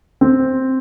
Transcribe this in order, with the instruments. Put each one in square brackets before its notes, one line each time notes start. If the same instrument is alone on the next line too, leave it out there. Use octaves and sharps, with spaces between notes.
[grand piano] C4